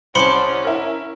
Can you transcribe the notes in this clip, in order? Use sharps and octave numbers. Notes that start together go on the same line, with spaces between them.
C2 C#4 C5 D5 A5 B5 C6 C#7
E4 A#4